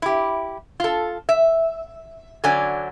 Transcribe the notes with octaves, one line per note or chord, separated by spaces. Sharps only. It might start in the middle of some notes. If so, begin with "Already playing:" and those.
E4 G4
F4 A4
E5
D3 F#3 C#4 D5 G#5